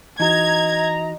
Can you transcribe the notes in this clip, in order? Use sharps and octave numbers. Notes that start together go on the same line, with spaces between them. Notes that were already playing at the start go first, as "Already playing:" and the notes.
E3 D#4 F#4 D#5 A#5 G#6